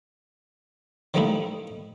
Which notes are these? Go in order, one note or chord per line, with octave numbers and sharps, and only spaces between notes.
D#3 F3 G3 A3 D#4 E4